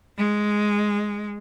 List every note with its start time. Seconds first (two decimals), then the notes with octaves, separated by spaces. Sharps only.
0.18 G#3